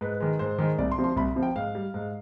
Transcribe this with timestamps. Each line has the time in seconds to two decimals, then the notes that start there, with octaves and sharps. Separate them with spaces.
0.01 G#2 B4
0.20 D#3 G#3
0.39 G#2 C5
0.58 D#3 G#3
0.78 C2 D5
0.92 C6
0.98 C3 F3
1.04 C6
1.16 C2 B5
1.36 C3 F3
1.43 G5
1.56 G#2 F5
1.75 G3
1.94 G#2